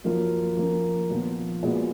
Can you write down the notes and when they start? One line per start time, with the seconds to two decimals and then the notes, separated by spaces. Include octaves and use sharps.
0.04 F#2 F3 A#3 F4
0.56 F3 A#3 C#4
1.10 A#2 F3 B3
1.63 A#2 G#3 B3 F#4